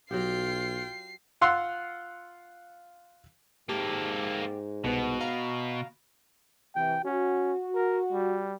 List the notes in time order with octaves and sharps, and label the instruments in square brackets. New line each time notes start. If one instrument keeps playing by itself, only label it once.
[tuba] B1 [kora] F#3 G4 [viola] F4 G5 [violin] C7
[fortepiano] F4 F5 F#5 C6 E6
[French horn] G#2 [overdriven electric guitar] A#3 A4 [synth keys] G4
[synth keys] C2 B3 [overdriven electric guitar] B2
[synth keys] F5 A#5
[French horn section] C3 E3 [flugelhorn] G5
[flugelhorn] C#4 [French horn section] F#4
[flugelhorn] A#4
G3